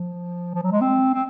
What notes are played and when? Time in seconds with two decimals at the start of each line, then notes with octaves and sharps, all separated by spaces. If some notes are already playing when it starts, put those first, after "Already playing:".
Already playing: F3
0.55 F3
0.63 F#3
0.71 G#3
0.81 C4
1.14 C4